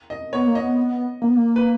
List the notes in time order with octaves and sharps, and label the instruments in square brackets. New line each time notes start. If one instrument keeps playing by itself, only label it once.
[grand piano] D#5
[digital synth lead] B3 [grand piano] C#5
[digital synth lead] A#3
[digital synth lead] B3 [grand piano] D#5
[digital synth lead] A#3
B3
A#3
[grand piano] B4